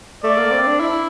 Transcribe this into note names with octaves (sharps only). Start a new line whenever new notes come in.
A3 D5
A#3
C4
D4
E4